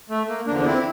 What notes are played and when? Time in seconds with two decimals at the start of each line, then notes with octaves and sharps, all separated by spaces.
0.10 A3
0.28 A#3
0.47 E2 D3 F3 A#3 D4
0.59 D4
0.66 C4 E4